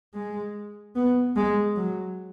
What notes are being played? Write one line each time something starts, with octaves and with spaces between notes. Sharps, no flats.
G#3
B3
G#3
F#3